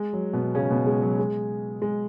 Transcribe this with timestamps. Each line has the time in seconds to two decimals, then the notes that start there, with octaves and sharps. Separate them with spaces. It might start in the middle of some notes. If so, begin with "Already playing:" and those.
Already playing: G#3
0.13 F#3
0.33 B2 B3
0.55 C#3 C#4
0.71 B2 B3
0.87 G#3
1.02 F#3
1.19 G#3
1.82 G#3